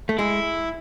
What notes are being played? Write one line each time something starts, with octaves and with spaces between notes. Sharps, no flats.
A3
G#3 E4